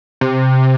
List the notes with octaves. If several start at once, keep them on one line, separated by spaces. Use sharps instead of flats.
C3